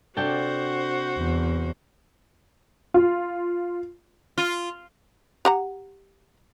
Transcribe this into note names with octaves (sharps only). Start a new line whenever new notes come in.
C3 D4 F#4 A4 C5 D5 F#5 G5
E2
F4
F4
G4 F#5 A#5